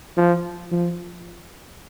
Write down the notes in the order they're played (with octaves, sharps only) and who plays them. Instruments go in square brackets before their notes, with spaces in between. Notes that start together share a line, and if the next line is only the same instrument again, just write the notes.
[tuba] F3
F3